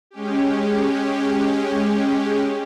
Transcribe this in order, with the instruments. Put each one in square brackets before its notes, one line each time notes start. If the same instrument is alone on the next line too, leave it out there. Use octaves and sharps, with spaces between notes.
[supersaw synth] G#3 C#4 G4